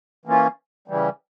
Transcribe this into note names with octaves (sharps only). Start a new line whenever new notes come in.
E3 A#3 C#4 F4
C#3 E3 G3